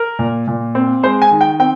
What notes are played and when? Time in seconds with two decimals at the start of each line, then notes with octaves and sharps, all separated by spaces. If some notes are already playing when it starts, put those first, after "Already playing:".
Already playing: A#4
0.19 A#2
0.47 A#2
0.75 C4
1.03 G#3 C5
1.22 G#5
1.31 D#3
1.41 G5
1.60 C4 G5